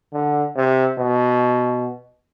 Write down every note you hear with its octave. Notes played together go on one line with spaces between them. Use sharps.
D3
C3
B2